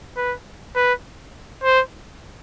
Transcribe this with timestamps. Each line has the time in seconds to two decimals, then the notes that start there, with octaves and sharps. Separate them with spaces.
0.17 B4
0.76 B4
1.63 C5